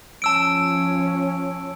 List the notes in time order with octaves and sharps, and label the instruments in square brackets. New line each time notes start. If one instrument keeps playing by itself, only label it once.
[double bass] F3 C#4 [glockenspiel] A5 E6 D7